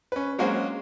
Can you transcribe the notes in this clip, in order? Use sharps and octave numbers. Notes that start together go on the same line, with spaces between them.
C#4 B4
F#3 G#3 A#3 C4 C#4 F#4